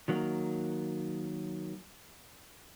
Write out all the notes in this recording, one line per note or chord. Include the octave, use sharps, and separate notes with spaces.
D#3 F#3 A#3